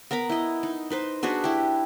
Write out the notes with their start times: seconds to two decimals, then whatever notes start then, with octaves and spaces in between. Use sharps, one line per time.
0.11 B3 A#4 A#5 B5
0.29 E4 D#5
0.63 D#4
0.90 D#4 B4 C5
1.23 D4 F#4 G#4 B4
1.44 E4 G4